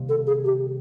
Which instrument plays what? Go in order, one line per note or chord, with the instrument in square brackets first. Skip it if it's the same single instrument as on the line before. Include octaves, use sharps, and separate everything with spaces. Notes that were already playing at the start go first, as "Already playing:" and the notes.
Already playing: [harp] C3 D#3 G3 A#3
[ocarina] A4
G#4
G4